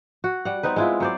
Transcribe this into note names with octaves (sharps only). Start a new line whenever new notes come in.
F#4
G3 F#5
B3 C4 D#4 B4
G#3 E4 F4
F#3 C5 D5